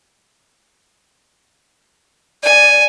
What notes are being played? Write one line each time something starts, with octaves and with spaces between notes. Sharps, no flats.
D5 G#5